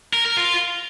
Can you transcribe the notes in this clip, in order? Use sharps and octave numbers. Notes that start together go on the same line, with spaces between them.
A#4
A#4
F4